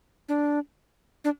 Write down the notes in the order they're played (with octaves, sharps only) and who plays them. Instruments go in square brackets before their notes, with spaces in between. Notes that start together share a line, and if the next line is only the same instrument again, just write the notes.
[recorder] D4
D4